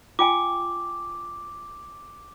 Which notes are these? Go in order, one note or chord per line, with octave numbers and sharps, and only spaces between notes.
F4 G5 G#5 D6